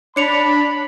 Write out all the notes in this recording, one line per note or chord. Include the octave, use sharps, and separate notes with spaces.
D4 C#5 B5 C#7 F7